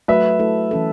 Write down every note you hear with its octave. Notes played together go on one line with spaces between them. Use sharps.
F#3 A3 F#4 B4 E5
A3 E4 A4
E3 C#4 A4